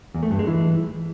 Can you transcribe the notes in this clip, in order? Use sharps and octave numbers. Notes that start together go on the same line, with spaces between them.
E2
A3
G2
G#3
E3